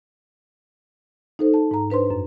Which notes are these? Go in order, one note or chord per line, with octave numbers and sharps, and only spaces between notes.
D#4 A4 C5
A5
G#2 A#5
D4 B4 C5 C6
F#2